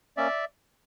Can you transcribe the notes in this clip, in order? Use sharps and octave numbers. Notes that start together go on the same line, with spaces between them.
A#3 C#4 D5 E5